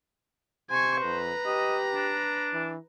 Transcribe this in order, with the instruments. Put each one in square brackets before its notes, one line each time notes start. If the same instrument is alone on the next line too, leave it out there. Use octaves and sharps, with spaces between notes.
[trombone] C3 [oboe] C5 [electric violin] G#5 C#6
[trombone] F2 [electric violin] B4 A#5
[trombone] G4 [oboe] D#5
[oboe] D4
[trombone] E3